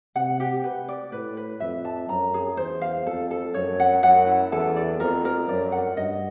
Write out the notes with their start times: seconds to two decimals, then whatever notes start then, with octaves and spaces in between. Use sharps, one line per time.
0.16 C3 F#5
0.40 G4
0.64 B4
0.89 D5
1.12 A2 B4
1.37 B4
1.60 F2 E5
1.85 A5
2.09 F#2 A#5
2.34 G#4
2.57 E2 C5
2.82 F5
3.06 F2 A4
3.31 A4
3.54 F#2 C#5
3.80 F#5
4.03 F#2 F#5
4.27 E4
4.52 E2 A4
4.76 D5
5.00 F2 A#4
5.25 A#4
5.49 F#2 D5
5.72 F#5
5.97 G2 D#5